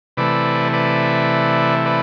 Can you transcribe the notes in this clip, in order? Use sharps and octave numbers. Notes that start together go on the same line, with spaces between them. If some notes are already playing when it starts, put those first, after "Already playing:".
C3 E3 A3 B4 D5
B4 D5
B4 D5